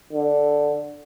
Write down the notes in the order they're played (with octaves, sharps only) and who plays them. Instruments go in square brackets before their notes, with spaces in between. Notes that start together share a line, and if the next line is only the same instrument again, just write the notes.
[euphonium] D3